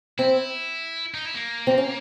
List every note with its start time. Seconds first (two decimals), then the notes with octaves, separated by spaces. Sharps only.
0.18 C4 E4
1.14 D#4
1.25 E4
1.35 A#3
1.67 C4
1.78 C#4